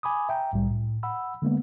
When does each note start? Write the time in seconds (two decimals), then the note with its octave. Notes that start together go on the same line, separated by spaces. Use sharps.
0.03 G#5 B5 D6 D#6
0.29 E5 G5 A#5
0.53 C2 A2 G3
0.70 A2
1.03 F#5 B5 E6
1.42 D3 G#3 A#3 B3